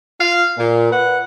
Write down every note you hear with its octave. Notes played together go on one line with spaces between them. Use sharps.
F4 F5
A#2
B4 F#5